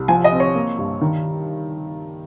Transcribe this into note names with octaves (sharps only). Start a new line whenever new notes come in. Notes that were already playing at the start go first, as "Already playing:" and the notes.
Already playing: C2
F3 G#5
D#5
C4
C#5
A#3
G2
D#3